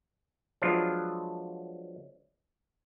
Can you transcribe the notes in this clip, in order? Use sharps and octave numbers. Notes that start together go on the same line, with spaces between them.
F3 F#3 G#3 B3 D4 F4